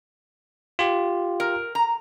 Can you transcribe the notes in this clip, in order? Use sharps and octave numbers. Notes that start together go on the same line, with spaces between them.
F4 G4
A#4
A#5